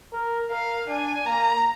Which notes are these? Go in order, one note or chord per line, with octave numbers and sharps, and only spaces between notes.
A#4
A#4 F5
D4 G#5
A#3 A#5